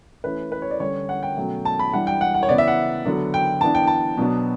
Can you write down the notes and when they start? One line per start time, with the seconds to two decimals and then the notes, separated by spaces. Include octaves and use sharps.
0.24 E3 A3 C#4 B4
0.52 B4
0.62 C#5
0.71 D5
0.80 D3 G3 C#4 C#5
1.09 F#5
1.23 G5
1.37 B2 F#3 A3 C#4
1.65 A5
1.79 B5
1.92 E3 G3 D4 F#5
2.07 G5
2.21 F#5
2.34 F#5
2.43 C#5
2.49 C#3 E3 B3 D5
2.58 E5
2.67 F#5
3.05 D3 F#3 B3 D4
3.34 G5
3.61 E3 B3 D4 A5
3.75 G5
3.87 A5
4.18 B2 F#3 B3 D4